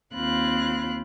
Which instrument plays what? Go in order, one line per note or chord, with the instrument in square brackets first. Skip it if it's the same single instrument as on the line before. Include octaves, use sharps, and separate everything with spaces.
[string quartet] D#2 C4 F4 B5 F#6